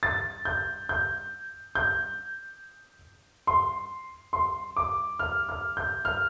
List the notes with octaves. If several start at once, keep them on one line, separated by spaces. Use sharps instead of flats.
A6
G6
G6
G6
C6
C6
D6
F6
F6
G6
F6